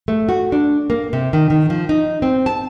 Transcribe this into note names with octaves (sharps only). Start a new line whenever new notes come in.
A3
F#4
D4
A#3
C3
D#3
D#3
F3
D#4
C4
A5